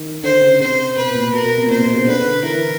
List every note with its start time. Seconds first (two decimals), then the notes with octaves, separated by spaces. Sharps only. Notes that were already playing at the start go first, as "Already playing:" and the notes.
Already playing: D#3
0.24 D3 C5
0.42 C#3
0.60 C3 C5
0.97 B2 B4
1.15 A#2
1.33 B2 A#4
1.46 B2
1.58 C3
1.66 A#2
1.70 B2 C5
1.82 B2
1.96 C#3
2.08 D3 B4
2.25 D3
2.43 E3 A#4